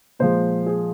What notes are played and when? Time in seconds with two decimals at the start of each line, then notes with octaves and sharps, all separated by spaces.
0.19 A#2 F3 G#3 C5
0.66 G#4